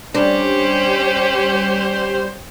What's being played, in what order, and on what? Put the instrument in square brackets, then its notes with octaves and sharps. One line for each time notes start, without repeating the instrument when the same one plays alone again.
[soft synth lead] G3 [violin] C#4 G4 [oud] D4 [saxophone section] C5